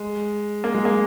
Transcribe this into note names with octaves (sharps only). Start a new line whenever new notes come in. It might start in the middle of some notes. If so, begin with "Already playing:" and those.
Already playing: G#3
A#3
G#3
A#3